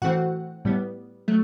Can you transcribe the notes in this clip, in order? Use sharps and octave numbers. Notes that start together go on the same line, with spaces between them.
A2 E3 A3 C4 F#4 F#5
A2 G3 B3
F#3 A3